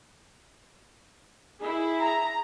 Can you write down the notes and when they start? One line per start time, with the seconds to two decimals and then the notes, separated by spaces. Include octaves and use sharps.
1.61 E4 G#4
2.03 A#5